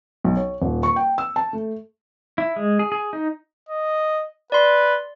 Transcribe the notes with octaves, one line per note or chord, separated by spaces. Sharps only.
B1
C#5
D#1
C#6
G5
E6
A5
A3
E4
G#3
G#4
G#4
D#4
D#5
B4 D5 C6